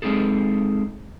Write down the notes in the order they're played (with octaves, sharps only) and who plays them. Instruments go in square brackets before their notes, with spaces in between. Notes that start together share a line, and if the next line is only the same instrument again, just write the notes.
[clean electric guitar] G#3 C4 D#4 G#4 A4